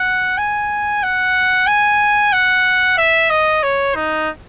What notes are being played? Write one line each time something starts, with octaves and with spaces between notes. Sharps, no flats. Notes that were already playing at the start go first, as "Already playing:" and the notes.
Already playing: F#5
G#5
F#5
G#5
F#5
E5
D#5
C#5
D#4